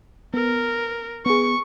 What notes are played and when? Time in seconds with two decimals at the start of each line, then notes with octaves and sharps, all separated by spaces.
0.34 B3 A#4
1.26 B3 G#4 C#6